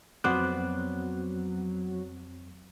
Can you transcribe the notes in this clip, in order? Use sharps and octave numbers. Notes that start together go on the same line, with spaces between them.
F2 F#3 B3 C4 C5 D5 F#6